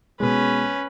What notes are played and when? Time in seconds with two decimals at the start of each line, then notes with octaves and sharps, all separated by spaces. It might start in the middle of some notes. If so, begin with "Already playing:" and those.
0.20 B2 G#3 C#4 B4